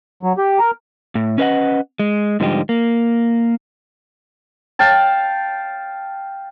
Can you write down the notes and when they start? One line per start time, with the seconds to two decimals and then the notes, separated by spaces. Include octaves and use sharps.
0.23 F#3
0.38 G4
0.59 A#4
1.15 A2
1.38 C#4 B4 D#5 F#5
1.99 G#3
2.40 G#2 D3 F3 G3 D#4 G4
2.69 A#3
4.79 F5 G5 A5